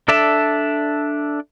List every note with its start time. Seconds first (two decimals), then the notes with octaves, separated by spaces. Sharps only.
0.08 D4 A4 D5 E5 A5